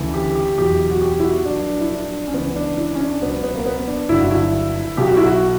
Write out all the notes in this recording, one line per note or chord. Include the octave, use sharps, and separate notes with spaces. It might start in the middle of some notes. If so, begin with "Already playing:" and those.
Already playing: D2 C#3 E3
G4
G4
E2 B2 F#3 G4
F#4
G4
E4
F#4
A#1 A#2 F#3 D4
E4
D4
C#4
C#2 C#3 E3 B3
D4
E4
C#4
D4
C#2 B2 F#3 B3
B3
A#3
B3
D4
G1 G2 D3 F#3 E4
F#4
E4
B1 B2 F#3 G4
F#4
E4
F#4